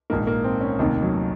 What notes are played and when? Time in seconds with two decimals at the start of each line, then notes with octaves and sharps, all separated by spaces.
0.10 A#1 G#2 D#3 A#3
0.27 A#3
0.44 C4
0.61 C#4
0.79 F1 D#2 D#3
1.02 F#3